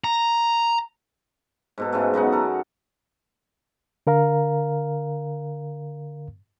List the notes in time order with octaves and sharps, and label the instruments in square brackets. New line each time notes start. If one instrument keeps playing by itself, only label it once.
[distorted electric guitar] A#5
[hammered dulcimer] G#2 B2 A4
G#2 C#3 G#3 A3
F#2 B3 D#4 F#5
A4 A#4
[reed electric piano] D3 A#4 F5 A#5